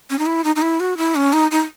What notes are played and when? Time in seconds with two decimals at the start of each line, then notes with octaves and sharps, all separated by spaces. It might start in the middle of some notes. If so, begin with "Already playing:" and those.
0.10 C#4
0.19 D#4
0.26 E4
0.44 D#4
0.56 D#4
0.62 E4
0.80 F#4
0.97 E4
1.15 C#4
1.33 D#4
1.51 D#4